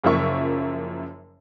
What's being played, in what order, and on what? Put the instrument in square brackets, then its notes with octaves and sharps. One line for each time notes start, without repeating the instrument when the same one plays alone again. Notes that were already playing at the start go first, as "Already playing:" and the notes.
[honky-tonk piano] F#1 F#2 F3 A#3 E5 C#6